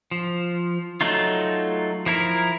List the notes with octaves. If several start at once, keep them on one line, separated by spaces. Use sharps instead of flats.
F3
F#3 A3 D#4 F4
F3 E4 A#4